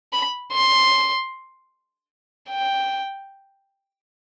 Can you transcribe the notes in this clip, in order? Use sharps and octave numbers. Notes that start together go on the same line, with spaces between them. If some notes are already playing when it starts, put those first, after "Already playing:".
B5
C6
G5